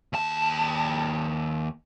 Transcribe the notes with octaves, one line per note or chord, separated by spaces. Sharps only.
D#2 A5